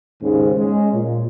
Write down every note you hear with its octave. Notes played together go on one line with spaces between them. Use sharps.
D#2 G#2 C#3
G#3 C#4
A#2